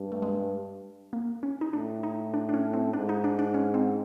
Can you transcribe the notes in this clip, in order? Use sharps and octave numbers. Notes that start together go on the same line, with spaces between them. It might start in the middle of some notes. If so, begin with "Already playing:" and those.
Already playing: G2
A3
G#3
A#3
C#4
D#4
A2 D4
D#4
D4
D4
C#4
C4
G#2 D4
D#4
D4
D4
C#4
C4